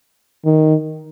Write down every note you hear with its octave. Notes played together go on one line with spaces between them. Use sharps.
D#3